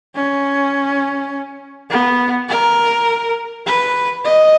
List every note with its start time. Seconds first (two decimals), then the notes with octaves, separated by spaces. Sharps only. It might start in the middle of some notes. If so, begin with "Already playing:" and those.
0.15 C#4
1.90 B3
2.49 A#4
3.67 B4
4.25 D#5